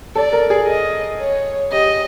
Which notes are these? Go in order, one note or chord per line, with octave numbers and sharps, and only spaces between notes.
A4 D5
A#4
G#4
D#5
C#5
G4 D#5